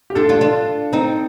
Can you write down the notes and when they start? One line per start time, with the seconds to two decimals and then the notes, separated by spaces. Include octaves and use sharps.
0.10 G4
0.15 D4 F4 A4
0.29 D4 F4
0.41 D4 F4
0.93 C4 D#4